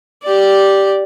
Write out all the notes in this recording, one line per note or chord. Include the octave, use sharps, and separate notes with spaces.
G4 D5